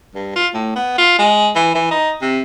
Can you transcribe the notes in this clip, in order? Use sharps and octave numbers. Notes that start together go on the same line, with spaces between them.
G2
F4
A2
B3
F4
G#3
E3
E3
D#4
C3